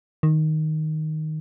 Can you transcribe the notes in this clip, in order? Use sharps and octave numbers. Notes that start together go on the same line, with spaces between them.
D#3